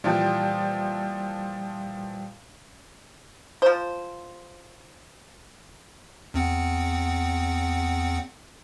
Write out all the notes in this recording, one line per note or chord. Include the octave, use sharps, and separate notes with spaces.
A#2 E3 F3 G3 G5
F3 C5
E2 C4 F#5